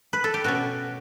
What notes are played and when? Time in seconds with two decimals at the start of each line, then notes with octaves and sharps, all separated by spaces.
0.13 B4
0.24 A4
0.34 G4
0.44 B2 A3 C#4 F#4